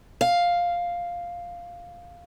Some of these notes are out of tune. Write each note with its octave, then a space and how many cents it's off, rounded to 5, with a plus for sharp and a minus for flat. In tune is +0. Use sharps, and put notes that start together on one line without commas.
F5 +0